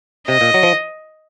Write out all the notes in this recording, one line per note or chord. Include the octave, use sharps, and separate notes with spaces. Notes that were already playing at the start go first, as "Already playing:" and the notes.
C3 D#5
A#2
F#3
F3